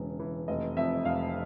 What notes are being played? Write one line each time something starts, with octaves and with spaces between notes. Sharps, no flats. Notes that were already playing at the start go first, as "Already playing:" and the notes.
Already playing: E1 C#3 E3
E3
F1 D#5
F2 E5
F1 F5